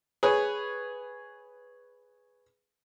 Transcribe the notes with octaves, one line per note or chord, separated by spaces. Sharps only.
G#4 B4 C#5